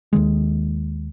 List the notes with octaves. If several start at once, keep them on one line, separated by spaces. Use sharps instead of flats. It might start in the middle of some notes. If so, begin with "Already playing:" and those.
D#2 D#3 G#3